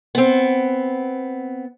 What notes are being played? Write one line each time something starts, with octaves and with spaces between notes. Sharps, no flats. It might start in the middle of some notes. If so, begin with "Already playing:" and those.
B3 C4